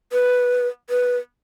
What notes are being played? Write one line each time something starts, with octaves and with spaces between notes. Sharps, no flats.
B4
B4